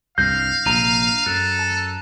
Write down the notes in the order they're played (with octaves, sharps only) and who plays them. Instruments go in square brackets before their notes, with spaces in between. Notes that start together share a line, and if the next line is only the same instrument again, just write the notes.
[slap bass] C2 G2 [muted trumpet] F5 [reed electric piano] G6 [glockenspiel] A#6 C7
[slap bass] A#1 C3 [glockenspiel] A#5 D#7 F7
[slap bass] F#2 [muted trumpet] A4 [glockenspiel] F#6
[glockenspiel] A5